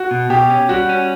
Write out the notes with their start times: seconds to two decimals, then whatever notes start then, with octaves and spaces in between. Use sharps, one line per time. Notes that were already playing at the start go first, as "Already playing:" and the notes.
Already playing: F#4
0.11 B2
0.30 B2 G4
0.50 C#4
0.69 G3 F#4
0.89 C#4